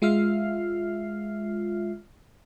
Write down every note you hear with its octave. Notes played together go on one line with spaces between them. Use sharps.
G#3 F4 E5 F6 C7